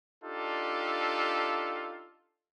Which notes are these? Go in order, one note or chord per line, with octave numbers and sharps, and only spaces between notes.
D4 D#4 F4 G4 A4